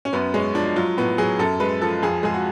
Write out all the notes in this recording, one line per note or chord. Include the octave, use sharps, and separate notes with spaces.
C#4
F#2 B3
G#3 C#4
F3 D4
F#3 F4
A2 B3
F#3 G#4
F#2 A4
G#3 B4
F3 A4
F2 G#4
G#3 G#4
F#4